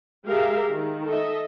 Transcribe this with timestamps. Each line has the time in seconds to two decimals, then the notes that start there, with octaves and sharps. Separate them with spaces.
0.24 G#3 G4 G#4 A#4 E5 F5
0.70 D#3
1.06 A4 D#5 E5